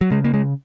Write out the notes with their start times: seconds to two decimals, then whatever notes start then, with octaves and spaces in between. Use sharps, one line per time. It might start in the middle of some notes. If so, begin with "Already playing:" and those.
0.01 F#3
0.11 C#3 G#3
0.24 A#3
0.34 G#3